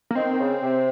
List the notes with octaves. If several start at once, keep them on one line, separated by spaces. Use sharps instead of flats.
A#3
D#3 C4
D#3
C#3
C3